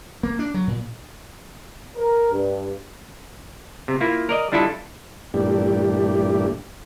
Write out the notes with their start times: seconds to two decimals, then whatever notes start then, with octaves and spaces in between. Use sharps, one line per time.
0.23 A#3
0.39 D4
0.54 F#3
0.67 A#2
1.96 A#4
2.31 G2
3.88 C3
4.00 A#3 E4 F4
4.29 A#4 D5 D#5
4.52 G3 D4 E4 F4 A4 D#5
5.34 G2 A#2 E3 A3 D4 G4